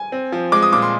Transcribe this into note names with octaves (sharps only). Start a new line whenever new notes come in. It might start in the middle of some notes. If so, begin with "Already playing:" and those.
Already playing: G#5
C4
F3
G#3 D6
D#6
A#2 D6
C6